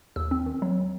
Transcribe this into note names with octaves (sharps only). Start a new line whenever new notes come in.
D#2 E6
C4
D#3
F#3